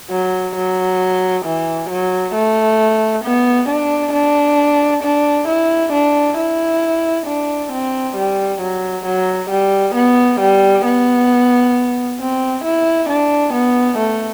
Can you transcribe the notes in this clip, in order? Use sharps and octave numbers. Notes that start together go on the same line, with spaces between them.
F#3
F#3
E3
F#3
A3
B3
D4
D4
D4
E4
D4
E4
D4
C4
G3
F#3
F#3
G3
B3
G3
B3
C4
E4
D4
B3
A3